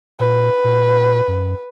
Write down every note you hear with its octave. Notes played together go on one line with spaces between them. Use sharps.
A#2 B4
A#2
F#2